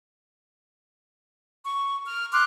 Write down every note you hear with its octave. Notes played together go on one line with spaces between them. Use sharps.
C#6
F6
C6 D6 F6 F#6